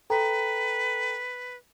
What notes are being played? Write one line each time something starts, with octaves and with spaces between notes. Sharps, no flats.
A4 B4 G5 A#5